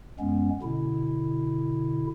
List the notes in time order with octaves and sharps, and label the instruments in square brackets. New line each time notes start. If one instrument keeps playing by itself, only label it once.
[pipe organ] F#2 G#3 B3 C#4
B2 D3 E4